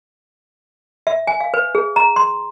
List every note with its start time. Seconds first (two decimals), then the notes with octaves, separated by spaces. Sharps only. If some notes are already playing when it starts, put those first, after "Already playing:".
1.07 E5
1.27 G#5
1.40 F5
1.54 B4
1.75 G#4
1.96 A#5
2.16 C6